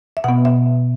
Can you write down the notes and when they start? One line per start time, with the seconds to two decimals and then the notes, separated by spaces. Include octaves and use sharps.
0.17 E5
0.24 B2 B3 F#5
0.45 E5